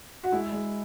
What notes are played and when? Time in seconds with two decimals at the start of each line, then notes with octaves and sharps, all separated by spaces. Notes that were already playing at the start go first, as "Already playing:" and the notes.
0.23 F#4
0.32 G#3 E4
0.52 G#3